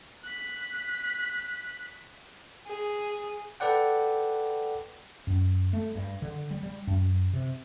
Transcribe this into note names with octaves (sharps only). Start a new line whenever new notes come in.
F#6 B6
G#4
A4 B4 D5 F#5 G5
F#2
A3
G2
D3
G3
G3
F#2
C3